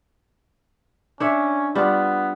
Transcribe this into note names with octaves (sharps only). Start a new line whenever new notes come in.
C#4 D4 C#5 E5
G3 B3 D4 F4